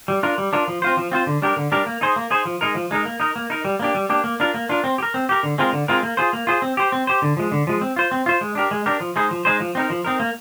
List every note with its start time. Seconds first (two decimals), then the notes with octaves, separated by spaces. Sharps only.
0.08 G3
0.23 D4 F4 A#4
0.38 G3
0.53 D4 F4 A#4
0.68 F3
0.82 C4 F4 C5
0.97 F3
1.12 C4 F4 C5
1.27 D3
1.42 G3 D4 G4 A#4
1.57 D3
1.72 G3 D4 G4 A#4
1.86 A#3
2.01 D#4 G#4 C5
2.16 A#3
2.30 D#4 G#4 C5
2.45 F3
2.61 G#3 D#4 A#4
2.75 F3
2.91 G#3 D#4 A#4
3.05 A#3
3.20 D#4 A#4
3.36 A#3
3.50 D#4 A#4
3.65 G3
3.80 A#3 D4 G4
3.95 G3
4.09 A#3 D4 G4
4.24 A#3
4.40 D4 F4 A#4
4.54 A#3
4.69 D4 F4 A#4
4.84 C4
4.98 G4
5.03 A#4
5.14 C4
5.29 G4 A#4
5.43 D3
5.58 G#3 C4 F4 A#4
5.73 D3
5.88 G#3 C4 F4 A#4
6.03 A#3
6.17 F4 G#4 C5
6.33 A#3
6.47 F4 G#4 C5
6.62 C4
6.77 G4 C5
6.92 C4
7.07 G4 C5
7.22 D3
7.37 F3 G#3
7.52 D3
7.67 F3 G#3
7.81 C4
7.96 F4 C5
8.12 C4
8.26 F4 C5
8.41 G#3
8.55 D4 G4 A#4
8.71 G#3
8.86 D4 G4 A#4
9.00 F3
9.16 G#3 D#4 G#4 C5
9.31 F3
9.45 G#3 D#4 G#4 C5
9.60 F3
9.75 C4 D#4 A#4
9.90 F3
10.04 C4 D#4 A#4
10.20 A#3